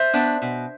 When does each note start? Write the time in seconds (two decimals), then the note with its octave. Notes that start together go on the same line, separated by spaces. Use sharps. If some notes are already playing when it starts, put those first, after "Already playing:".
Already playing: C5 E5
0.13 B3 D4
0.42 B2